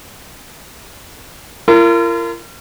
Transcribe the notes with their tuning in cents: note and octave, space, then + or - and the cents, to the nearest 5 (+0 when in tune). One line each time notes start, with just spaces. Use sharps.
F4 -45 A#4 -20